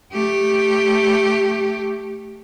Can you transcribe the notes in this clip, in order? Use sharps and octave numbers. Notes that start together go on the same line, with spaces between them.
A3 G4